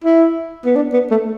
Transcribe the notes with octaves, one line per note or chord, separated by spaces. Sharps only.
E4
B3
D4
B3
A3